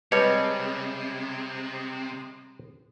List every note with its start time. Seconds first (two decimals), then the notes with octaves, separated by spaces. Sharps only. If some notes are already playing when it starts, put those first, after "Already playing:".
0.12 C3 G3 G#3 B4 C#5 D#5 A5